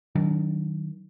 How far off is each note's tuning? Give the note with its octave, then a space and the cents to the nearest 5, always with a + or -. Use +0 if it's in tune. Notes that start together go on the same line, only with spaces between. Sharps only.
D#3 +0 F#3 +20 D4 -30